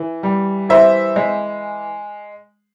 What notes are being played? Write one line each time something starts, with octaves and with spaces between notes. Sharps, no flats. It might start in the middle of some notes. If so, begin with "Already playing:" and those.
Already playing: E3
G3
E3 C5 E5
G#3